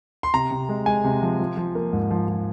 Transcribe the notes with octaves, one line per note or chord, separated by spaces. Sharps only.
C6
C3 A#5
C3
G#3
G#3 G#5
C3
F3
F3
F3
A#3
G#2
F3
F3